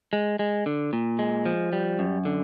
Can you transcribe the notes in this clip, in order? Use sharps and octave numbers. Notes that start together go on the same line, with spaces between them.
G#3
G#3
D3
A#2
G#3
F3
G3
F#2
D3